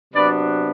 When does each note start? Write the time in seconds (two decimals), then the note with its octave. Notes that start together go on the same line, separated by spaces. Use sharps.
0.14 C3 F#3 B3 D4 B4 D5